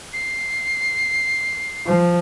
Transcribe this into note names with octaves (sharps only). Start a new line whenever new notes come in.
C7
F3